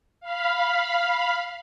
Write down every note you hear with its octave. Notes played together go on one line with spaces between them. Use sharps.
F5 B5